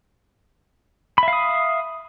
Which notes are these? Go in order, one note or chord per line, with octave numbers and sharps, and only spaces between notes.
E5 F5 B5 D#6